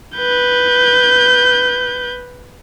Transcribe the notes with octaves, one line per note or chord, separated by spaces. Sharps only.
B4 G6